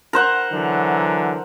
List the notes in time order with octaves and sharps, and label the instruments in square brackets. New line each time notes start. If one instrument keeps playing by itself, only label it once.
[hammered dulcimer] A#4 C5 F#5
[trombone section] D3 E3 F#3